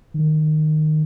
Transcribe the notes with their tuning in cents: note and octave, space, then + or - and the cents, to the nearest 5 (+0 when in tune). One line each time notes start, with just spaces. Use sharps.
D#3 -15